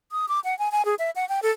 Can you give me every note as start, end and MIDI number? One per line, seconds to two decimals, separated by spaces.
0.12 0.28 87
0.28 0.40 86
0.44 0.57 78
0.59 0.72 80
0.72 0.85 80
0.85 0.95 68
0.99 1.10 76
1.16 1.27 78
1.29 1.40 79
1.42 1.51 69